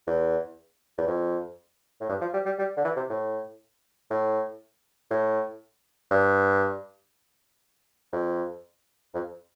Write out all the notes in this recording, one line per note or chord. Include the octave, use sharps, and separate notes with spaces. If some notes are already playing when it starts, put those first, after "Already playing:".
E2
E2
F2
A2
G2
F3
G3
G3
G3
D3
E3
C3
A2
A2
A2
G2
F2
F2